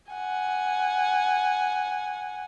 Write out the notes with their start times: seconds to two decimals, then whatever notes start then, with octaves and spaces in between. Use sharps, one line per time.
0.12 F#5 G#5